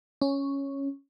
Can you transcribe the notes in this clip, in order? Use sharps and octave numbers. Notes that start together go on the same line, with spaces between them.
C#4